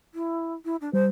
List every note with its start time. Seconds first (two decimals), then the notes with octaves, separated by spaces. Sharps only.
0.14 E4
0.65 E4
0.81 D4
0.93 G3 C5